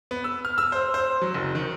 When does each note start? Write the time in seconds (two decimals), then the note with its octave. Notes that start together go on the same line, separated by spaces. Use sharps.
0.11 B3
0.24 E6
0.45 F6
0.58 E6
0.72 C5
0.94 C5
1.22 F#3
1.34 F#1
1.55 D#3